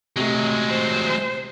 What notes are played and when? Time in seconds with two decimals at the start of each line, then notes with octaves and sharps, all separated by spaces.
0.16 C3 F#3 G#3 A3
0.70 C5